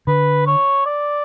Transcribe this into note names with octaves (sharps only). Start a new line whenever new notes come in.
D3 B4
C#5
D5